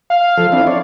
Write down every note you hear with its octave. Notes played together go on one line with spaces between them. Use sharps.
F5
F3 A4
C4 D4 E4
C#5 D5